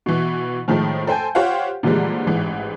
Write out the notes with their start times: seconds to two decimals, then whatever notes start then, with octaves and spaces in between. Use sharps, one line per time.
0.06 B2 E3
0.68 A2 D#3 F3 G#3 A3
1.07 A4 C5 G5 G#5 G6
1.35 F4 G4 C5 C#5 F5 F#5
1.83 A#2 D3 E3 F3 G3 G#3
2.26 A1 G#2 E3